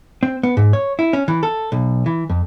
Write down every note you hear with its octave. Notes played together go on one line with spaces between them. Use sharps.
C4
B3
G#2
C#5
E4
C#4
E3
A4
B1
E3
F2